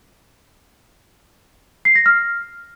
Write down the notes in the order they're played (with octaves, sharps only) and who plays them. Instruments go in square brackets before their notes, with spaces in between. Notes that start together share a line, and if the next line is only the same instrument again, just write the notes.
[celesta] C7
A#6
F6